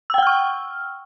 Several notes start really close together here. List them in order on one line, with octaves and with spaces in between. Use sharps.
E6 G5 F#5 F6 C#6